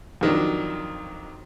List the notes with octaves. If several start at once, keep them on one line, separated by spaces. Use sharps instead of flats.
F2 D#3 F#3 D4